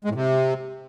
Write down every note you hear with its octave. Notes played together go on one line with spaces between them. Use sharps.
G#3
A2
C3